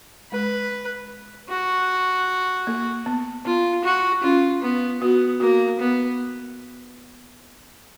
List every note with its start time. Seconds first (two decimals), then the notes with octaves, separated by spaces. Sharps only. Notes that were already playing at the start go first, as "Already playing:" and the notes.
0.32 G#3 B4
1.49 F#4
2.67 A#3
3.06 B3
3.45 B3 F4
3.84 F#4
4.23 C#4 F4
4.62 B3
5.01 B3 F#4
5.40 A#3 F#4
5.79 B3